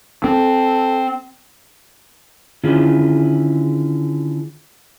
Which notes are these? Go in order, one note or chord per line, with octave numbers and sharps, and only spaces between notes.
C4 A4
D3 D#3 C#4 E4 F4 G#4